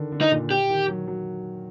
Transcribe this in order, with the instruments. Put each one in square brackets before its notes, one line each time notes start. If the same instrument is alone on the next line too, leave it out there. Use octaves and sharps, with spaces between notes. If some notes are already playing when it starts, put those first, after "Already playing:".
Already playing: [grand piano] D3 D#3
D3
[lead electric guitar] D#4
[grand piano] A#2
[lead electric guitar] G4
[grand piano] D#3
F#3
F#3